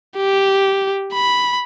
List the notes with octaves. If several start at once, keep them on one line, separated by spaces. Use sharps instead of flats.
G4
B5